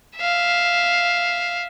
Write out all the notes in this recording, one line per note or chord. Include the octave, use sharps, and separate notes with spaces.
E5 F5